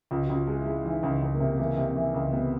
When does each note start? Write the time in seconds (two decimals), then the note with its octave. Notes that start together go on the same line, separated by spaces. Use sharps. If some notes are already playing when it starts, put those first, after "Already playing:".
0.11 C#2 F4
0.25 C#2 F#4
0.36 F4
0.47 G#3
0.60 E4
0.66 G#3
0.85 E3 D#4
1.03 C#2
1.22 C#2
1.35 A#3
1.40 C3
1.59 E3 A#3
1.77 C3
1.96 E3
2.14 C#2
2.33 C3 B3